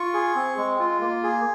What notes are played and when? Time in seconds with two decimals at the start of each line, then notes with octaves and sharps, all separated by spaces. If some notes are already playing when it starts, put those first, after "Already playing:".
Already playing: F4 C#6
0.14 G#4
0.36 C4
0.58 G#3
0.80 F4
1.01 A#3
1.23 G#4